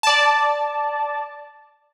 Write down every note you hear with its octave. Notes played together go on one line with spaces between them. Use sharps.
D5 A5